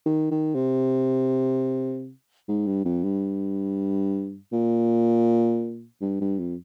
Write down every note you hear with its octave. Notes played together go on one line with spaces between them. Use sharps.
D#3
D#3
C3
G#2
G2
F2
G2
A#2
G2
G2
F2